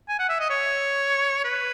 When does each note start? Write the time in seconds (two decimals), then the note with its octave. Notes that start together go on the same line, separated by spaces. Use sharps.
0.09 G#5
0.19 F#5
0.29 E5
0.40 D#5
0.50 C#5
1.44 B4